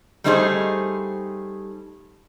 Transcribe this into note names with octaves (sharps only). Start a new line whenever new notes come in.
G3 A3 D4 D#4 G#4 C5